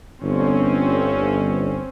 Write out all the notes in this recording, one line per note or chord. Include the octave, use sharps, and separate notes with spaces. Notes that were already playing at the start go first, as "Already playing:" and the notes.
G1 C4 C#4